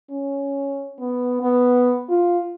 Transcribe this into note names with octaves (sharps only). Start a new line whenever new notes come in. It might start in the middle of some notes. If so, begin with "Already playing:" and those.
C#4
B3
B3
F4